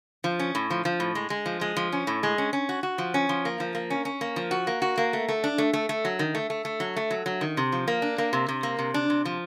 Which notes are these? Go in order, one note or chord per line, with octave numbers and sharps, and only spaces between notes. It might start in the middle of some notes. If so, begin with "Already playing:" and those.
F3
C#4
A2
F3
F3
A2
G#3
G#3
F3
G#3
F3
C#4
A2
G#3
C#4
C#4
F#4
F#4
F3
C#4
F3
A#3
F3
A#3
C#4
C#4
A#3
F3
F#4
A#3
F#4
A#3
A3
A3
D4
A3
A3
A3
F#3
D#3
A3
A3
A3
F#3
A3
F#3
F#3
D#3
C3
F3
A#3
D4
A#3
C3
C3
A#3
C3
D4
C3
F3